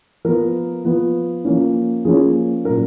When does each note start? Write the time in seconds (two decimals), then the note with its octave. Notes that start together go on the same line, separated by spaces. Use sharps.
0.25 F3 B3 A#4
0.85 F3 B3
1.45 F3 A#3 C#4
2.05 F3 A#3 C#4 G#4
2.65 A#2 F#3 C#4 A#4